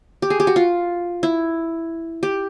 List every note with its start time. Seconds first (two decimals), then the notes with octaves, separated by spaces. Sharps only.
0.22 G4
0.30 G#4
0.40 G4
0.47 F#4
0.56 F4
1.23 E4
2.23 G4